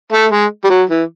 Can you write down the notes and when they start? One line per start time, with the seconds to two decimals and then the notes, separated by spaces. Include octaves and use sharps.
0.12 A3
0.32 G#3
0.64 G3
0.70 F#3
0.89 E3